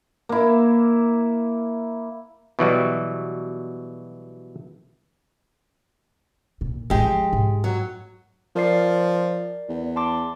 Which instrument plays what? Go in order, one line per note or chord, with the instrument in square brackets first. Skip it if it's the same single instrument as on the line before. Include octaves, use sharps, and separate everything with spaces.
[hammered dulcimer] A#3 E4
[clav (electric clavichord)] B2 E3 F#3 G3
[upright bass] A#2
[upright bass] D1 A1 [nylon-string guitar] G#3 G4
[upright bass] F3
G#2
[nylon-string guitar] F#3
[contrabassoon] F3 [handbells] A#4 D5 C7
[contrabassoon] E2
[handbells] A5 C6 D6